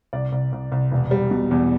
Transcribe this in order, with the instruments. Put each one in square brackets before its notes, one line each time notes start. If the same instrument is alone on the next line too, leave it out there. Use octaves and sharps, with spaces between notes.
[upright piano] C2 D5
C2
C2
C2
E1
G3
B2
E2